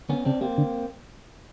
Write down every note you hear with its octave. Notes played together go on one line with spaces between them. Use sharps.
D3 B3 C#4
C#3 C4 D4
C3 A#3 C4
D3